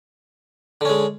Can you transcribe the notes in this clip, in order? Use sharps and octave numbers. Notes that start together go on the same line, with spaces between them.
D3 G#3 C#4